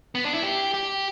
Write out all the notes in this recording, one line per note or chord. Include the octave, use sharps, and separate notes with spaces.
B3
D4
E4
G4
G4